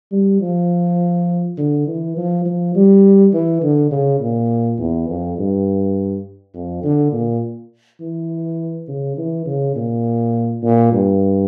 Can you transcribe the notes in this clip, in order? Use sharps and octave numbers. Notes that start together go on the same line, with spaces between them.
G3
F3
D3
E3
F3
F3
G3
E3
D3
C#3
A#2
E2
F2
G2
F2
D3
A#2
E3
C#3
E3
C#3
A#2
A#2
G2